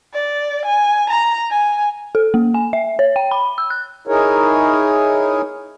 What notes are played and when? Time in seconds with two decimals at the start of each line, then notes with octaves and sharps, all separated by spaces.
0.14 D5
0.66 G#5
1.10 A#5
1.51 G#5
2.15 A4
2.34 A#3
2.54 G#5
2.73 E5
2.99 C#5
3.16 G5
3.31 B5
3.58 E6
3.70 F#6
4.08 D#4 E4 G#4 A#4 C#5